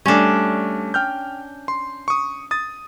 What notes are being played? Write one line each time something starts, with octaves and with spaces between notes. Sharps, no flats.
G3 A3 C#4 D4
G5 F6 G6
C6
C#6 D#6
D#6 A6